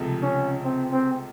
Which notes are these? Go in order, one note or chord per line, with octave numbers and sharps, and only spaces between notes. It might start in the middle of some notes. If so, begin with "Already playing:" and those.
Already playing: C#2 C3 F3 A3
C#4
C4
C4